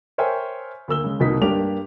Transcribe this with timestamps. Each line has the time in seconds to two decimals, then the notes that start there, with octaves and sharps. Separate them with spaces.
0.18 A#4 C5 C#5 E5 G5 G#5
0.88 D2 A#3 E6 G7
1.04 C#3 G#3
1.20 F1 C2 B2 A#3 D#4 B6
1.42 G2 A#3 D4 G4 D6 F7